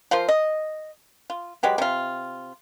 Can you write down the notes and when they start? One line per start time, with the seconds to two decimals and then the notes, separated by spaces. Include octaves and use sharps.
0.11 F3 F4 A#4 C5
0.29 D#5
1.30 F4
1.63 F#3 G#3 G4 B4
1.78 C3 F4